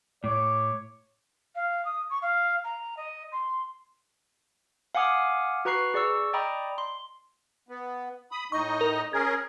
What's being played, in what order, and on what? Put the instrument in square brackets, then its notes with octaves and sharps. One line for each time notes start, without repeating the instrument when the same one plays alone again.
[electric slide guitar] A2 [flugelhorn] C#5 [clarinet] D6
[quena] F5
D#6
C#6
F5
A#5
D#5
C6
[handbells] F5 F#5 G#5 D6 D#6 F6
F#4 B4 A#5 C#6 F#6 C7
G#4 D5 C#6 E6
D5 D#5 G5 A#5 B5 D#6
C6
[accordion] B3
B5 D#6
[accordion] A2 D#4 D#5 [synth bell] C#6
[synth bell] A#4
[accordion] C#4 G#4 A#4 [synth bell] G#6